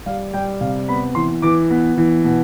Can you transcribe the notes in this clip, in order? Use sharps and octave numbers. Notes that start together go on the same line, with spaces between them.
G3 F5
G3 G5
C3 F5
B3 B5
E3 C6
E3 D6
B3
E3
B2